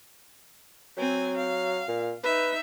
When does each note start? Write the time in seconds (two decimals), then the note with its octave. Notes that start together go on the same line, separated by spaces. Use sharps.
0.97 F#3 C4 G#5
1.37 F5
1.89 A#2
2.24 D#4 B4 E5